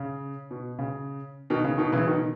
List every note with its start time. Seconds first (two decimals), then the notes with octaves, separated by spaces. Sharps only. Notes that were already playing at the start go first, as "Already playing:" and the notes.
Already playing: C#3
0.51 B2
0.79 C#3
1.50 B2 D#3
1.64 C#3
1.78 B2 D#3
1.92 C#3 E3
2.07 B2 D#3